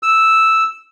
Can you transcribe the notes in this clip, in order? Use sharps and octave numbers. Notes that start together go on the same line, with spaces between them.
E6